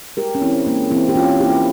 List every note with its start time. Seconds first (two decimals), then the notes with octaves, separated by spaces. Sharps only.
0.17 G#3 G4 A#4
0.35 C#4
0.42 E3 C4 E4
0.67 G#3 A#3 C#4
0.91 E3 C4 E4
1.09 G4
1.15 E3 C#4 F4
1.40 A#3 E4 G4